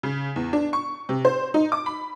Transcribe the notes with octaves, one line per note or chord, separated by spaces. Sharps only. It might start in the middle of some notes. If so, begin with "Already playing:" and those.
C#3
E2
D4
C#6
C3
C5
D#4
D6
B5